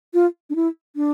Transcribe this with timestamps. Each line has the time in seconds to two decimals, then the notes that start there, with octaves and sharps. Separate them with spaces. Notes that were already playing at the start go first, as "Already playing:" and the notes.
0.14 F4
0.50 D4
0.55 E4
0.96 D4